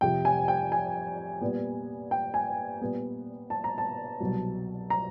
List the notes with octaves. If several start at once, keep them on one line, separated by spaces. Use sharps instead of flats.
F2 C3 F3 G5
G#5
G5
G#5
A#2 G3 B3
G5
G#5
A#2 G3 B3
A5
A#5
A5
C2 B2 F#3
A#5